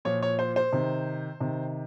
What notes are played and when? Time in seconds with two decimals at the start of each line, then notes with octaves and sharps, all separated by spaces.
0.05 A#2 F3 C#5
0.23 C#5
0.39 C5
0.56 C5
0.73 C3 D#3
1.40 C3 D#3